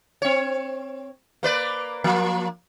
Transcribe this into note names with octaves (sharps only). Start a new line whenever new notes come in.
C4 C#5
A#3 B4 D5
F3 A#3